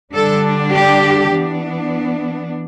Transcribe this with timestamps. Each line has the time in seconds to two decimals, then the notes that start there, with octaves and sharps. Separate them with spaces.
0.14 D3 G3 D4 A4
0.73 G4
1.32 E3 B3 D4